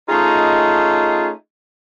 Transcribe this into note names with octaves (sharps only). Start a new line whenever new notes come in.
A3 C#4 D#4 F4 G#4 D#5